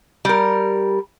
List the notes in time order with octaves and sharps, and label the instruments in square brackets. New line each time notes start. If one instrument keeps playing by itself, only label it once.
[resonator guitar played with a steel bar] G3 A#4